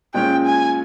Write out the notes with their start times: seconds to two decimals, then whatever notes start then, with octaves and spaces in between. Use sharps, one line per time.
0.14 A#2 G#3 C#4 G5
0.46 G#5